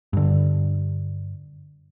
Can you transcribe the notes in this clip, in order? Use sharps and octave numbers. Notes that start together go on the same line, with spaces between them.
G2 D3